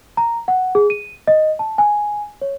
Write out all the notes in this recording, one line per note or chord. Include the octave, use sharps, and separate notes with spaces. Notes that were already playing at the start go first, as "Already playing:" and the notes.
A#5
F#5
G#4
D#7
D#5
A5
G#5
C#5